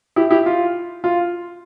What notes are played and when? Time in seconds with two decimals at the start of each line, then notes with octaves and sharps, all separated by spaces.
0.16 E4 G4
0.30 E4 G4
0.46 F4
1.04 F4